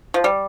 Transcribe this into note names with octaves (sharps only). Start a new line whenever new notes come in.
F3
G3